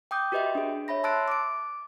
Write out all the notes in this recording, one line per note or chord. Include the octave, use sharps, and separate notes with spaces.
G5 D6 D#6 G6
F#4 G4 B4 D#5 E5 G5
D4 G#4
C#5 E5 B5 A#6
A5 C6 E6 F#6 A6 D7
D6 D7